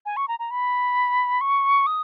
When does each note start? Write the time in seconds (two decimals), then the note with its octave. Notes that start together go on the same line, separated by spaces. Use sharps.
0.06 G#5
0.17 C#6
0.28 A#5
0.39 A#5
0.51 B5
1.41 C#6
1.87 D#6